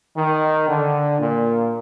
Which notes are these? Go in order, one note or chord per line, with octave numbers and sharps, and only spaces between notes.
D#3
D3
A#2